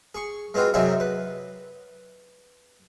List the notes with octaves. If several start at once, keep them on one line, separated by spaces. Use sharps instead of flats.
G#4 C#6
G#3 B3 C4 F4 F#4
F#2 C3 F#3 D#4 G#4 E5
B4